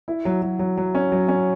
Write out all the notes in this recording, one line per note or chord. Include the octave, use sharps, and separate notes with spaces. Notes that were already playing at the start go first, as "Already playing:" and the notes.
E4
F#3
F#3
F#3
F#3
C#4
F#3
C#4